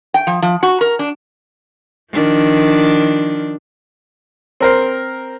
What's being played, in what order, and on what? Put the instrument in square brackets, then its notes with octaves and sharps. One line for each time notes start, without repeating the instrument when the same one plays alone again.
[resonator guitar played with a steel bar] G5
F3
F3
F#4
A#4
D4
[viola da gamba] D#3 F3 D4
[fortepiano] C4 A#4 C5